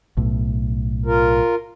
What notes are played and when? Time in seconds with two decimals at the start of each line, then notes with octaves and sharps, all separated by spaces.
0.17 B1 A2
1.06 F4 A#4